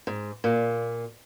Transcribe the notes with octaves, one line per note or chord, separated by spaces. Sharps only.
G#2
A#2